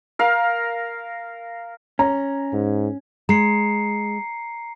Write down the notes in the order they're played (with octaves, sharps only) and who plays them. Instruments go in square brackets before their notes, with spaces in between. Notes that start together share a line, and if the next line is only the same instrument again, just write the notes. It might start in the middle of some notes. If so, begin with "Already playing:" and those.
[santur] A#4 F5
[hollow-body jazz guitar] C#4 [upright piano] A#5
[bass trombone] G#2
[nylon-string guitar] G#3 [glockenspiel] A#5 C7 C#7